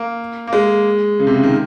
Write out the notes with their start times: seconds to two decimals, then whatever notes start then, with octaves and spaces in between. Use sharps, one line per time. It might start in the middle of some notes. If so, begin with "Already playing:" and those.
Already playing: A#3
0.47 A#3
0.53 G#3
1.19 C#3
1.27 C3
1.35 C#3
1.43 D#3